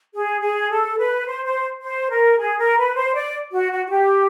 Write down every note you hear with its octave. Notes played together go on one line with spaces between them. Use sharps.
G#4
G#4
A4
B4
C5
C5
C5
A#4
G#4
A#4
B4
C5
D5
F#4
F#4
F#4
G4